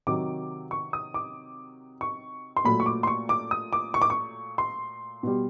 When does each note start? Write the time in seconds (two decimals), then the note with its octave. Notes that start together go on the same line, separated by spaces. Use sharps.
0.07 C3 D#3 F#3 D6
0.71 C#6
0.93 D#6
1.14 D6
2.01 C#6
2.57 C6
2.64 A#2 F#3 A3 B5
2.80 C#6
2.86 D6
3.03 C6
3.07 C#6
3.29 D6
3.51 D#6
3.73 D6
3.94 C#6
4.02 D6
4.10 C#6
4.58 C6
5.23 B2 G3